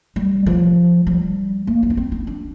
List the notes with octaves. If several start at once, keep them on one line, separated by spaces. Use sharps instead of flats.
G3
F3
G3
A#3
D#4
D4
C4
D#4
D4